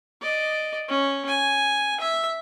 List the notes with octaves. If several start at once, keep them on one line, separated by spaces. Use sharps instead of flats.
D5 D#5
C#4
G#5
E5